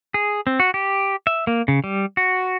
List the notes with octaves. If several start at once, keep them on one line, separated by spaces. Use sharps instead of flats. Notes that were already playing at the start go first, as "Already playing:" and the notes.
G#4
C4
F#4
G4
E5
A#3
C#3
G3
F#4